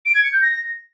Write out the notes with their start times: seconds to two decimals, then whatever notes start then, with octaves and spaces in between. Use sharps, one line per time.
0.05 D7
0.14 G#6
0.23 C#7
0.32 G6
0.41 A#6